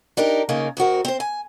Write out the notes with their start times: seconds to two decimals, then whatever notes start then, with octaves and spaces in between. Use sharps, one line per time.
0.17 D4 D#4 G4 A#4
0.49 C#3 A3 A#3 D#4
0.77 F2 C4 F#4 A#4
1.05 C4 C5
1.20 G#5